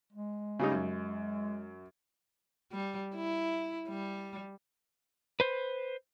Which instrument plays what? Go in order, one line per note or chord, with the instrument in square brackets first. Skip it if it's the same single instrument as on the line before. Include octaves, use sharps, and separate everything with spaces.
[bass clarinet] G#3
[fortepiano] C#3 G3 D#4
F#2
[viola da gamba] G3
E4
G3
[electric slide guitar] B4 C5